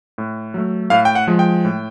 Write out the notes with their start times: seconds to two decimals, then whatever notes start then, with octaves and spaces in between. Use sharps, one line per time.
0.18 A2
0.54 F#3 A3
0.90 A2 F5
1.05 G5
1.15 F#5
1.27 F3 G#3
1.39 G5
1.65 A2